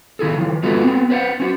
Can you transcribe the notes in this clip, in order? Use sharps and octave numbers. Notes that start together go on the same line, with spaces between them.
D#3 E4 G#4 A4
D#3 F3
G#3 B3 F4 F#4 A4 B4
B3 C4
B4 C5 E5 F#5
C#4 F#4